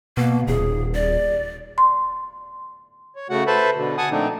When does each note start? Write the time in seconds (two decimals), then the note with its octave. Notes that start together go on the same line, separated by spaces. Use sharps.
0.17 B2 A#3
0.47 D#1 G#4
0.95 D5
1.78 C6
3.16 C#5
3.30 C#3 A3 F#4 F#5
3.47 A4 B4 C5 E5 A5 B5
3.76 B2 D3
3.98 F#5 G#5 A5 D#6
4.11 A#2 F3 A3 C4 D4 D#4